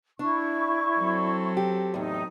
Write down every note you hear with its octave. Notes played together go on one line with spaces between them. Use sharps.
D4 E4 C#6
F#3 C4 A4
G4
E2 A2 D#4